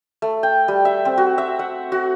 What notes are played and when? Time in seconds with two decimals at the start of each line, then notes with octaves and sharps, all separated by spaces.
0.22 A3
0.43 G5
0.68 G3
0.85 E5
1.05 C4
1.18 F#4
1.38 E5
1.59 F#5
1.92 F#4